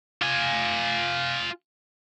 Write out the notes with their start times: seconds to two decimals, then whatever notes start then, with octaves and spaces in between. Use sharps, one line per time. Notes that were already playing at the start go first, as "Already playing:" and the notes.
0.22 F4 G#5